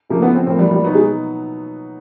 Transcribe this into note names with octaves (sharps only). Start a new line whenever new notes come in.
C#3 F3 A3 A#3 D4
B3
C4
A2 F3 A#3 C4
G3
G3
B2 F#3 B3 D#4
G#3